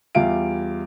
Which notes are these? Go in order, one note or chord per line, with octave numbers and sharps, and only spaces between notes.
E2 G3 F4 E5 F5 D7